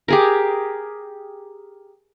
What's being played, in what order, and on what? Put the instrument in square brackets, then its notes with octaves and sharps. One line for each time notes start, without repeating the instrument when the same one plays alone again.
[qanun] G4 G#4 A#4